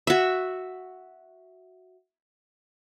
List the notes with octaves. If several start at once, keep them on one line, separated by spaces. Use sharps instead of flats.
F#4 E5